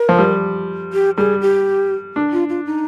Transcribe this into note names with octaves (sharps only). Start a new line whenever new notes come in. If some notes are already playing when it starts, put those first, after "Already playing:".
Already playing: A#4
F3
G3
G4
G3 G#4
G4
D4
F4
F4
D#4